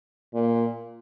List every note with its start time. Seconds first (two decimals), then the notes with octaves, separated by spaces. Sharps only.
0.34 A#2